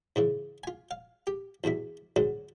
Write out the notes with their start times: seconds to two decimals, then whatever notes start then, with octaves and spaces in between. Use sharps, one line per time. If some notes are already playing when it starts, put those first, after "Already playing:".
0.16 G#2 C#3 E3
0.64 F4 G#5
0.91 F5
1.27 G4
1.64 E2 G2 B2 E4
2.16 D2 G#2 F#3 G#3